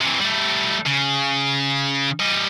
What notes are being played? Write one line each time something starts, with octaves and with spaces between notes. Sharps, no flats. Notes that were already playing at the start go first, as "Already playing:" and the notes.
C3 E3
G3 A3
C#3
G3 D#5